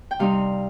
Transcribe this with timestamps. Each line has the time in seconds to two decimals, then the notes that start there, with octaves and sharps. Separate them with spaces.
0.11 G5
0.19 C3 G3 C4 D#4 F5